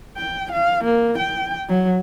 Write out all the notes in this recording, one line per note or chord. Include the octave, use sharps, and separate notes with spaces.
G5
F5
A#3
G5
F#3